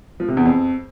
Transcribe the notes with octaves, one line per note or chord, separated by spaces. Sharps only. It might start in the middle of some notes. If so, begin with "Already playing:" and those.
F3
C3
E2
F2